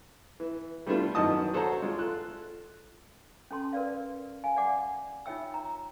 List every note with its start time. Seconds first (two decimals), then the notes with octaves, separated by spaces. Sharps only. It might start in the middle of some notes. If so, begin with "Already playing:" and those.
0.40 E3
0.86 G3 A3 B3 D4 E4 F4
1.15 F#2 D#3 E3 D#5 A5 D#6
1.54 F#4 A4 C5 C#5 A5 A#5
1.82 G#3 F4
1.98 F4 A4 F#6
3.51 C#4 A4 A5 C6
3.73 A#4 B4 D5 F5
4.44 F5 G#5
4.56 D5 E5 F#5 D6
5.26 D#4 F4 C#5 E5 G5 E6
5.54 A#5